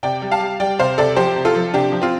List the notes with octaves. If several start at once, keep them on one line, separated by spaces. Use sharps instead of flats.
C3 D5 G5
G3
F5 A5
G3
G3 D5 G5
C3 C5 F5
C3 A4 D5
F3 G4 C5
C3
F4 A4
F3
C3 D4 G4
F3
C4 F4